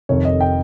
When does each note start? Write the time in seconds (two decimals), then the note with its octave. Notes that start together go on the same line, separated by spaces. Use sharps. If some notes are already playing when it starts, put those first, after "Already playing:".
0.09 F1 F2 C3 D#3 C#5
0.25 D#5
0.41 G5